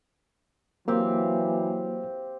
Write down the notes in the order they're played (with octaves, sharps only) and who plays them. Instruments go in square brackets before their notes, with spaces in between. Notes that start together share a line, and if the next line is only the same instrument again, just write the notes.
[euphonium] E3 [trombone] F#3 [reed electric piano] A#3 [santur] C4 G4 F5